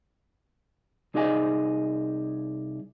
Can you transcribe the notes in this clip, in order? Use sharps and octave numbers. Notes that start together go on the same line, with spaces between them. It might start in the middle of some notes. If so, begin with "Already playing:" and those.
C2 D#4 G#4 D5 D#5 G#5